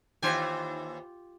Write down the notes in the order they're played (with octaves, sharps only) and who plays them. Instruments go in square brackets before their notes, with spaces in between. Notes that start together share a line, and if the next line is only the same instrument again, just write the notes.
[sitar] D#2 E3 C5 [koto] F4 G4 G#5